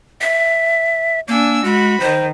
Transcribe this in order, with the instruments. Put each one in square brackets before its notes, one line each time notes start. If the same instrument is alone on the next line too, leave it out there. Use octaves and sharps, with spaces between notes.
[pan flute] E5
[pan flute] A#3 [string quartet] D4 G#5 E6
[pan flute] G#3 [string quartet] F#4 B5
[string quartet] D#3 [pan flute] C5